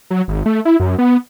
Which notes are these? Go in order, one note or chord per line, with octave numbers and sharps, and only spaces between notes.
F#3
G#1
A3
E4
F#2
B3